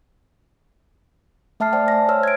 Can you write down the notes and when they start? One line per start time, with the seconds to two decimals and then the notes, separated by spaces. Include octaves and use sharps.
1.60 A3 E5 A5 F6 C7
1.73 C5 D5 G5 A5
1.88 G#5 A#6
2.09 C5 C#5 E6 F6
2.23 G#6 D7